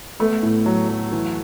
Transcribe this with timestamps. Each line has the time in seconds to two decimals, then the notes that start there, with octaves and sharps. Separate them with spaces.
0.19 A3 B3
0.43 A2
0.66 F#3
0.89 F#3
1.12 E3